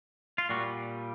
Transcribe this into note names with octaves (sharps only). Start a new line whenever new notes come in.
F4
A#2 G3 F#4